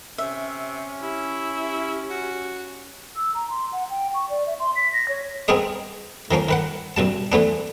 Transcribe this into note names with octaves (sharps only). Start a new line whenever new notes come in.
C3 C#4 E5
E4 G4
F#4
E6
A#5
C6
F#5
G5
C#6
D5
E5
C6
B6
A#6
C#5
B3 C4 G#4 A#4 D#5
D#3 F3 A#3 C#4
D#3 B4 F#5
F#2 B2 G3 A5
E3 A3 B3 D4